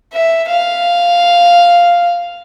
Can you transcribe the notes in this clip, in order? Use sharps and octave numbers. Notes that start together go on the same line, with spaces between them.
E5
F5